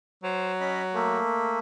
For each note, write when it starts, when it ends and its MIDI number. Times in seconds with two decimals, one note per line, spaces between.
0.23 1.19 54
0.23 0.52 72
0.60 0.82 61
0.60 0.82 75
0.60 0.82 83
0.94 1.59 57
0.94 1.59 58